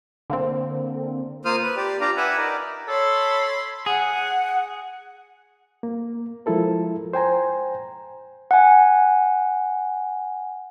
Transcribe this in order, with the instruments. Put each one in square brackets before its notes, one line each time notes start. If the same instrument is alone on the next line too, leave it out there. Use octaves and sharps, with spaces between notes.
[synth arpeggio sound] D3 A#3 C4
[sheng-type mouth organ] A#3 F4 C5 D#6 F6
B4
G4 D5
D4 F4 G4 D5 F5 A#5
B4 E5 F#5 G#5
D#4 A#4 D5
[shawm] A4 [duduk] C#5 [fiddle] B5 C6
[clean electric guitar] G#4 [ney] F#5
[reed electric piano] A#3
F3 G#3 E4 A4 A#4
C5 G5 G#5 A#5
[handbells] F#5 G#5